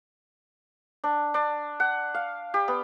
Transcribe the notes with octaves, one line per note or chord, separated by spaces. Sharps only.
D4
D4
F#5
F5
G4
B3